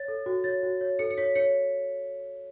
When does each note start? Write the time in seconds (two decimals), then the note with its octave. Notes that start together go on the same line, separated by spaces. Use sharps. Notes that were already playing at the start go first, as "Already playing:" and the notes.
Already playing: C#5 A6
0.08 A4
0.26 F#4
0.44 C#5 A6
0.63 F#4
0.81 C#5
0.99 A4 C#7
1.10 C#7
1.18 C#5 B6
1.35 C#5 C#7